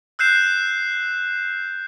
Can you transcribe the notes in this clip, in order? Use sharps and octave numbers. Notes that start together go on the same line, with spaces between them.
E6 F#6 G6 C7 E7